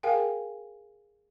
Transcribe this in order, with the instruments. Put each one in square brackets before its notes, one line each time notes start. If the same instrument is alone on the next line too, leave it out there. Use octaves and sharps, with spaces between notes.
[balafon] G#4 A#4 F5 G5 G#5